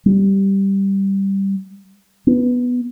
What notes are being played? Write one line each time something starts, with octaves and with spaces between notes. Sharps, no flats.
G3
B3